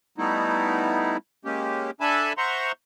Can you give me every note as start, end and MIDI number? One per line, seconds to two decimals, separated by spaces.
0.18 1.17 55
0.18 1.17 57
0.18 1.17 59
0.18 1.17 63
0.18 1.17 64
1.45 1.91 56
1.45 1.91 58
1.45 1.91 61
1.45 1.91 67
2.00 2.33 62
2.00 2.33 69
2.00 2.33 76
2.00 2.33 80
2.00 2.33 81
2.00 2.33 83
2.38 2.72 72
2.38 2.72 76
2.38 2.72 78
2.38 2.72 82
2.38 2.72 84
2.38 2.72 85